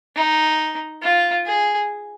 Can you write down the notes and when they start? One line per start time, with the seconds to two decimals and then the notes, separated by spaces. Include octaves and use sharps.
0.16 D#4
1.03 F4
1.46 G#4